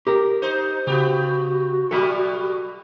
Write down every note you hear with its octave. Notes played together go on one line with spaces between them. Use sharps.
G4 A#4
D#4 C5
C#3 B3 F#4 G4
B2 F#3 G3 A4 E5 B5